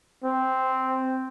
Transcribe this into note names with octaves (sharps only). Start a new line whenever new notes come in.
C4